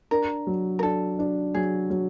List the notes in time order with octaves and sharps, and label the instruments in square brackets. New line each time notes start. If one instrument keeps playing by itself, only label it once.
[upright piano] D4 [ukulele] A#4
[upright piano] F#3
[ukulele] A#4
[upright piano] D4 [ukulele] A4
[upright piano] D4
[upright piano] F#3 [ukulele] G#4
[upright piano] F#3